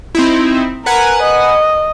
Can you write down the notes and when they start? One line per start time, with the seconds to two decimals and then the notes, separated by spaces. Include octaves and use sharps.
0.15 C4 D#4 E4
0.86 A#4 B4 F#5 G#5
1.23 D#5